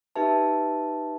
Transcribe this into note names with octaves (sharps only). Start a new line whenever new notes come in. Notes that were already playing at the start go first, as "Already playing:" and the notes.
D#4 G4 B4 E5 A5